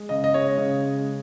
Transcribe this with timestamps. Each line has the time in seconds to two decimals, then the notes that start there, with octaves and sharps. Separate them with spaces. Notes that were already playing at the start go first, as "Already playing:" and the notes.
Already playing: G#3
0.09 C#3 D#5
0.24 D#5
0.34 G#3 C#5
0.58 C#3
0.82 G#3